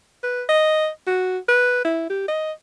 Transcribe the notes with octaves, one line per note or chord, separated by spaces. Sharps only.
B4
D#5
F#4
B4
E4
G4
D#5